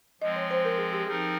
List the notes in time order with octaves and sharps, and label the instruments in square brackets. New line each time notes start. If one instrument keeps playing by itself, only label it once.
[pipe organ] F3 G#3 C4 [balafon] D#5
[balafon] C#5
C5
A#4
G#4
G4
[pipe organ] F3 C4 D#4 A#4 [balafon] G#4